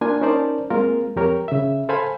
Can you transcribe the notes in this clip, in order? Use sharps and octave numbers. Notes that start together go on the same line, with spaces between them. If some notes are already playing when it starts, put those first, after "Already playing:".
A#3 D4 F4 G#5
C#4 D#4 A#4 C5 D5 A5
G#3 A#3 C4 F4 A#4
F2 G4 A#4 C#5
C#3 E5
A4 C5 F5 G#5 B5